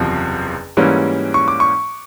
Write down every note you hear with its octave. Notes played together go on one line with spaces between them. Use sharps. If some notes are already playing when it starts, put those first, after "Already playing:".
Already playing: F#1 E2 C3 F3
G#2 E3 G3 A#3 C#4
C#6
D6
C#6